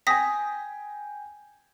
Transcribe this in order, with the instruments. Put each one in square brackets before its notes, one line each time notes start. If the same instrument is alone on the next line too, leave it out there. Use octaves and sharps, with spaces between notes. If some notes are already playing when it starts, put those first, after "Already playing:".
[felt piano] G5 G#5 [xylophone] D#6 A#6 B6